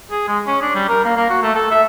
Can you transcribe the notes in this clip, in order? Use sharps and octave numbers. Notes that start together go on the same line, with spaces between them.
G#4
G#3
C#4
D4
G3
A#4
A#3
A#3
F#4
A3
A4
E5